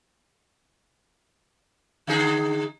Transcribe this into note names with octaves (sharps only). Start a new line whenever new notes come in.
D3 D#4 G#4